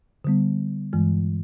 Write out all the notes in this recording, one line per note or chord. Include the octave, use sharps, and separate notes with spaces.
D3 G3 B3
G2 E3 G#3